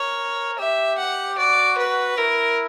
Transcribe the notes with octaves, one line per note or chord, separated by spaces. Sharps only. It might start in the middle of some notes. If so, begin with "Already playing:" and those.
Already playing: A#4 C#5
G4 E5
F#5
F#4 D5
B4
E4 A#4